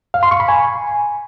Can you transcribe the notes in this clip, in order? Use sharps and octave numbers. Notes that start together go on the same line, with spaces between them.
F5
C6
C#6
B5
G#5